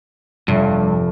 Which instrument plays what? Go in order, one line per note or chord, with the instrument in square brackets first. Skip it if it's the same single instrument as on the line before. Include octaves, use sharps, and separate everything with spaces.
[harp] F1 [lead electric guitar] G2